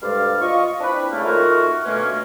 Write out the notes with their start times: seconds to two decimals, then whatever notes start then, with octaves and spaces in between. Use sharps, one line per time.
0.02 D2 G2 G#3 D5 F5
0.41 F4 D#5 C#6
0.81 C4 D4 E4 B4
1.12 C#3 A3 A#3
1.24 D#3 A3 F4 F#4 A#4
1.85 B2 D3 A3 A#3 C#4